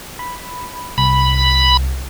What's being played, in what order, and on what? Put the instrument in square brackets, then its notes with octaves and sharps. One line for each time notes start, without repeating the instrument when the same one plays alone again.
[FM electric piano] B5
[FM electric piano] C2 [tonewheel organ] B5